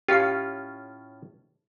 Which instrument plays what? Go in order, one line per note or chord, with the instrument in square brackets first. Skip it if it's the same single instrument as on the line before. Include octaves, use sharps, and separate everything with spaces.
[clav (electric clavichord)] A2 C#4 F4 [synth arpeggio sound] G4 F5 C#6